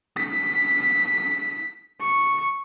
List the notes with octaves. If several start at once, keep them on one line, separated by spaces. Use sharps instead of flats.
B6
C#6